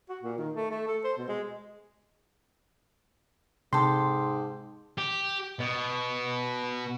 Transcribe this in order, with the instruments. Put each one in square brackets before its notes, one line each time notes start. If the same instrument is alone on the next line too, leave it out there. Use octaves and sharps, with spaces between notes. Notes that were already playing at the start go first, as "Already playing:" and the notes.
[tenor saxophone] F#4
A#2
D#3
A3
A3
A4
C5
B2
G#3
[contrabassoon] G#2 [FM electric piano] C3 [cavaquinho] G4 A4 [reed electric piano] C6
[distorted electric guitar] G4
B2